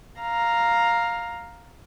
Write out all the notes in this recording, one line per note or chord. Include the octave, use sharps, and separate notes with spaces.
F5 A#5